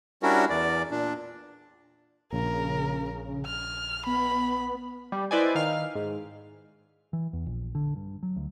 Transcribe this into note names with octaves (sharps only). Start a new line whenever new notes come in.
G3 C#4 D4 E4 F#4 A#4
E2 D5
A#2 D4
A#1 C#3 A#4
F6
B3 B5
G3
E4 B4 C5 D5 D#5 G#5
D#3 F5 F6
G#2
E3
E2
A#1
D3
G2
F#3
D2